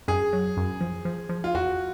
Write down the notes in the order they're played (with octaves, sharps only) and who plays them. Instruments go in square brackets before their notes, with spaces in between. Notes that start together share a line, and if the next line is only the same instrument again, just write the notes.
[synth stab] F#2 [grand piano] G#4
[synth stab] F#3
F#2
F3
F3
F3
[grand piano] F4
[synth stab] E2 [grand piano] F#4